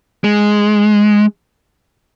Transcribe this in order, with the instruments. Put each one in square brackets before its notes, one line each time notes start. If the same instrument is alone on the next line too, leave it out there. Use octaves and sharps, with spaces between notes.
[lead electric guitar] G#3